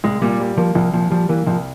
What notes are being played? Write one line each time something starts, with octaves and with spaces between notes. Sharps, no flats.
C2 G#3
A#2 G3
G3
F3 A#3
C2 F3
A#2 F3
F3 G3
E3 A#3
C2 F3